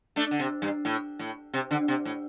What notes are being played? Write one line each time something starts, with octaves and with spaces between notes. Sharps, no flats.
A3 D4
D3
C3
G2
A2
A2
C3
D3
C3
A2